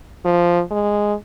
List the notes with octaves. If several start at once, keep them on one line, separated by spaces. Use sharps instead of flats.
F3
G#3